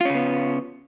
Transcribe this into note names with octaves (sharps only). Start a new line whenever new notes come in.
C#3 B3 C#4 F4